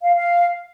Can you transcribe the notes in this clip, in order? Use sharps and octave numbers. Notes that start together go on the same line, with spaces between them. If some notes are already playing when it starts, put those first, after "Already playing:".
F5
F5